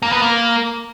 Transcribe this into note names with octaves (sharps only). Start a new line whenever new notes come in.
A#3
B3
A#3